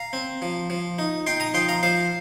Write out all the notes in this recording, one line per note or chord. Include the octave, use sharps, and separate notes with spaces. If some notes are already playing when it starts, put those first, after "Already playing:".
Already playing: F5 A#5
C4
F3
F3
D#4
D#4 G5 C6
A#5 D#6
F3 G5 C6
F5 A#5
F3 C5 F5